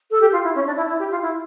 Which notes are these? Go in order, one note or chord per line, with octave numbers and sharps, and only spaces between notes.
A4
G4
F4
E4
C#4
D4
E4
E4
G4
F4
E4